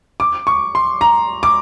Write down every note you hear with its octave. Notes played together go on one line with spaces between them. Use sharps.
D6
C#6
C6
A#5
D6